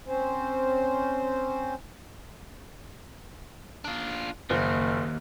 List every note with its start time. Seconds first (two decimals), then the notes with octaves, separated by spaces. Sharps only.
0.07 C4 C#4 C5
3.84 D4 F4
4.50 F#1 D#2